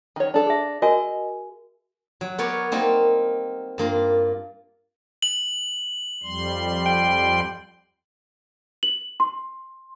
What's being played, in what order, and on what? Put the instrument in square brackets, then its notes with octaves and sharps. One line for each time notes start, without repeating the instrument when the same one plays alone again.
[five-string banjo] D#3 C#5
D4 A4
[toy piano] G#4 E5
[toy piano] F#4 A#4 G#5 [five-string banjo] D#5
[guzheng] F#3
B3 A#4 C#5 D5
G3 A#3 C4 D#4
G2 A#3 F4
[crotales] F#7
[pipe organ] F2 G3 C6
[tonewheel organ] G5
[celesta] F#7
C6